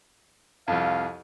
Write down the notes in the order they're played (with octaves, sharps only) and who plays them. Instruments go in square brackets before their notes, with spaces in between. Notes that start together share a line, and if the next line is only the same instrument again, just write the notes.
[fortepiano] C2 F2 [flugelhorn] F5